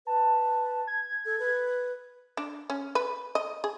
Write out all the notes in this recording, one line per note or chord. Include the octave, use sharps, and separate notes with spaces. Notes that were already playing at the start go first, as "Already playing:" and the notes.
B4 A5
G#6
A4
B4
D4
C#4
B4
D#5
G#4